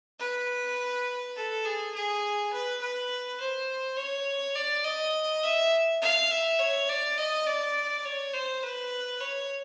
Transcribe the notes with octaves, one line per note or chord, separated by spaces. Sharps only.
B4
A4
G#4
G#4
B4
B4
C5
C#5
D5
D#5
E5
F5
E5
C#5
D5
D#5
D5
C#5
C5
B4
C#5